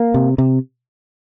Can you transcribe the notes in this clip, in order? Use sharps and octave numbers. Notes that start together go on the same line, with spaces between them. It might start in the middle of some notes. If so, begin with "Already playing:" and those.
Already playing: A#3
C3
C3